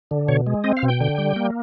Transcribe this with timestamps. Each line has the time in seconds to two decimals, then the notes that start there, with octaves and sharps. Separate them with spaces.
0.11 D3
0.28 B2 C#5
0.47 G#3
0.64 C4 D#5
0.77 F5
0.83 B2
0.88 G5
1.01 D3
1.18 G3
1.36 A#3